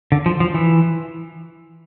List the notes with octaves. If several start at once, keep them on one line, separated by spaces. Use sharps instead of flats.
D3
F3
F3
E3